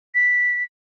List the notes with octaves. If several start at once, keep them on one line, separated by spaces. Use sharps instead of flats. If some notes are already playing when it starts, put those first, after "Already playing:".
B6